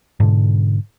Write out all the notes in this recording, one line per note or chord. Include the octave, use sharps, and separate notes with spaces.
G#2 B2 D3